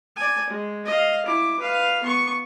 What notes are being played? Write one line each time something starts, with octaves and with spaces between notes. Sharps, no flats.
D5 G#5
G#3
D#5 F5
E4 D6
B4 F5
B3 C#6